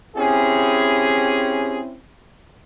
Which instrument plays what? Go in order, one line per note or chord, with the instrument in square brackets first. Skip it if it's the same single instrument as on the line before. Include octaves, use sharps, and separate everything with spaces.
[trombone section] C4 C#4 E4 [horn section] G4 G#4